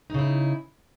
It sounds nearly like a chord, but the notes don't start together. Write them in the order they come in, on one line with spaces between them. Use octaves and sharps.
D#4 C#3 E4